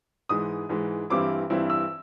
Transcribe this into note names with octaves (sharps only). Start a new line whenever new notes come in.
G#2 E3 G#3 D#6
G#2 E3 G#3
G2 E3 G3 C4 E4 D6
G2 E3 G3 C4 E4
E6